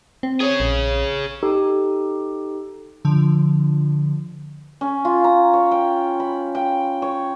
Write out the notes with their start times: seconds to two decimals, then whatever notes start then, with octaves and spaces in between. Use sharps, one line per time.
0.23 C4
0.40 G#4 C#5
0.60 A#1
1.43 D#4 G4 A4
3.05 D3 F3
4.81 C#4
5.05 F4
5.24 A#5
5.53 C#5
5.71 G5
6.20 B5
6.55 G5
7.02 C#5